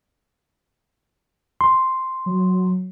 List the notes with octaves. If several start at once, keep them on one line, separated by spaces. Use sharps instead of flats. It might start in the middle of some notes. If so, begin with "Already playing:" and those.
C6
F#3